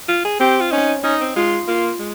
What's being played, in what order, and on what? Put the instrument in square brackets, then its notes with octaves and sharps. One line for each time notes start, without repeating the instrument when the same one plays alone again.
[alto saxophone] F4
G#4
[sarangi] C4 [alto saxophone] G4
[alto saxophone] F4
[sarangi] C#4 [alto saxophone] D#4
[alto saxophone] C#4 [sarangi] D#4
[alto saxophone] C4
[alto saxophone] G#3 [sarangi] F4
[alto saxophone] A#3 [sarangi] F4
[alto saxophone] G#3